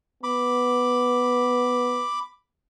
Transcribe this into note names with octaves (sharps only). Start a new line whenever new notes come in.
B3 B5 D6